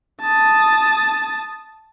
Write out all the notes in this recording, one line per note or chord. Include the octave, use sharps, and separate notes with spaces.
A5 D#6